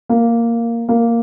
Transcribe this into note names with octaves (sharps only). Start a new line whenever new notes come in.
A#3
A#3